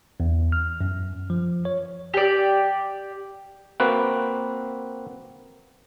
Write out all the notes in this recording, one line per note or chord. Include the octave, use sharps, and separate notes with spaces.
E2
F6
F#2
F3
C#5
G4 D5
A#3 C4 F#4 B4